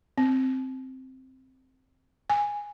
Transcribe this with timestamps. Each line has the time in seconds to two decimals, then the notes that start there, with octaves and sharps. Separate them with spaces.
0.18 C4
2.30 G#5